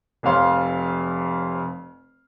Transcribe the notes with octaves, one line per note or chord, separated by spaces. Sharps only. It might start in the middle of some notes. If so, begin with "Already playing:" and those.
F1 F2 C#5 F5 C6